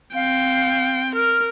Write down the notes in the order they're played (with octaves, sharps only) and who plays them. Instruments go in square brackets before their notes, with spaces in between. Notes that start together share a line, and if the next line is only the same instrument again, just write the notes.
[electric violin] C4 G5 [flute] F5
[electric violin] A#4 [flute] F6